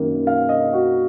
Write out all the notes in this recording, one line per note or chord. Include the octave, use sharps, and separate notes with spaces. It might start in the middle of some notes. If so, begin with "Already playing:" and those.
Already playing: F#2 D#3 A#3
F5
D#5
F#4